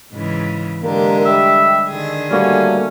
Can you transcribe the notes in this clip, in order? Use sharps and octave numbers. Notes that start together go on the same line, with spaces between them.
G#2 C#3 E3
D3 G#3 A#3 G4
G3 E5
D3 D#3 G#4
G3 A3 A#3 C#4 F#4